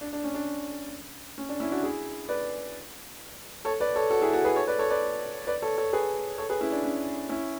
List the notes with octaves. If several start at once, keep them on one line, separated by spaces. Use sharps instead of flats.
D4
D4
C#4
D4
C#4
D4
C#4 E4
D4 F#4
E4 G#4
B4 D5
A4 C#5
B4 D5
A4 C#5
F#4 A4
E4 G#4
F#4 A4
G#4 B4
A4 C#5
B4 D5
A4 C#5
B4 D5
B4 D5
A4 C#5
A4 C#5
G#4 B4
A4 C#5
G#4 B4
C#4 E4
D4
C#4
C#4 E4